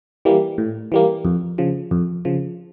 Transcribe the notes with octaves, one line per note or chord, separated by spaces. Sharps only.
E3 G3 A#3
A2
E3 G3 A#3
F2
C#3 F3
F2
C#3 F3